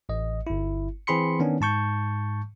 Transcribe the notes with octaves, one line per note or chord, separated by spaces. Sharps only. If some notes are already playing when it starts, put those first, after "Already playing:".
A1 D#5
G1 E4
E3 C4 G#4 B5 C6 C#7
D#3 B3 C#4 D4
G#2 A5 C#6 G6